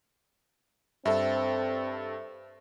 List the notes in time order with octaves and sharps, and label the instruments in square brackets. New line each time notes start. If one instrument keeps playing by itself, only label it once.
[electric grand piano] G2 A4 [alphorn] C4 [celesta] E5